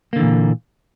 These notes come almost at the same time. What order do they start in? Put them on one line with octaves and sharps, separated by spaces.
A#3 D3 E3 A#2